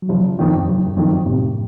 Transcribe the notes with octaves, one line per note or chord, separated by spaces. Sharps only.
F#3
F#1 F3
F3
F2 D#3
F#2
F2
F#1 F#2
F#2
F2 D#3
F#2
A2 C3